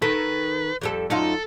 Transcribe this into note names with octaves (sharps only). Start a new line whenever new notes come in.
D#3 A4 B4
F2 G3 A4
F#2 D#4 F4 A4